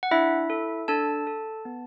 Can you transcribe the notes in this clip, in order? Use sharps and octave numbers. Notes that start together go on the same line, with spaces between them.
F#5
D4 E4 E5
A4
D4 A4 A5
A4
B3